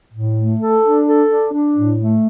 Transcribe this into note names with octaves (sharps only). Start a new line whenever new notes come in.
A2
A3
A4
D4
A4
D4
D4
A2
A3